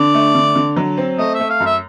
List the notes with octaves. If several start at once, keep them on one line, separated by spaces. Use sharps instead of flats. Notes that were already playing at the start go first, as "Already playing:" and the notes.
Already playing: D3 D5
A3
D3
D3
F#3
C4
A3 D#5
E5
A3
F5
F#2
E5